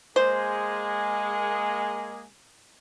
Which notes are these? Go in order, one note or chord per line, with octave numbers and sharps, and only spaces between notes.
G#3 A#3 G#4 C5